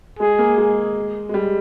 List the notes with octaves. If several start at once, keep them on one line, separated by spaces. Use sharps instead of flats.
G#3 G#4
A#3
G#3
G#3
G3